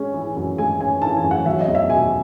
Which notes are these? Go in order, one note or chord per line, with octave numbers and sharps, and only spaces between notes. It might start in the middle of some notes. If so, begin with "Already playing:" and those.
Already playing: G#3 C#4
E3
F#2
G#3 G#5
C#4 G#5
E3 A5
G#5
F#2
F#5
F#3 E5
D#5
E2
E5
B2 G#5